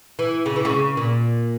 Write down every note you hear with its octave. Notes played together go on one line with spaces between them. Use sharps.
E3
C#3
E3
C#3
A#2